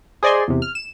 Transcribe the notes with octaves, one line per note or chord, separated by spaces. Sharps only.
G#4 C5 D5 D#5 G#5 C6
E2 C3
F6
E7